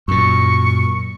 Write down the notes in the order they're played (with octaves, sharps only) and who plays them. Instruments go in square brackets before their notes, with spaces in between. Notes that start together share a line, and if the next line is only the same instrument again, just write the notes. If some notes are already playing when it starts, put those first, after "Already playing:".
[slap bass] F#2 A#2 [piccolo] C#6